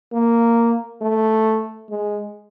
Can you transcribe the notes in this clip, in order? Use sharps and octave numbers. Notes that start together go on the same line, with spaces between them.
A#3
A3
G#3